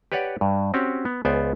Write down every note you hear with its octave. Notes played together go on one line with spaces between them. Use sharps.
G4 B4 C#5 D5 F#5
G2
C4 C#4 F#4 G4 C#5
B3
C#2 B3 C5 D5 G#5